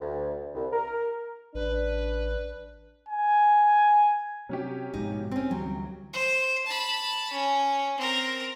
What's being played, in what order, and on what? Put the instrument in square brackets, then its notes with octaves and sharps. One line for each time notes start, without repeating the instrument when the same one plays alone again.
[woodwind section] D2
C2
A#4
[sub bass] A1 [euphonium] D4 [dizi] B4
[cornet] G#5
[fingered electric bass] C3 [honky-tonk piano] F#3 C#4 G4
[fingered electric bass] A#1 G#2 B2 [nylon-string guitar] D#4
[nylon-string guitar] C4 C#4 [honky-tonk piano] G5
[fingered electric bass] D2 E3 G3 [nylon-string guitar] F#3
[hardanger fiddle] C5
A5 B5
C#4
C4 A#4